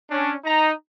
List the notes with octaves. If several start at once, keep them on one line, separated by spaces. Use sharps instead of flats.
C#4 D4
D#4 A#5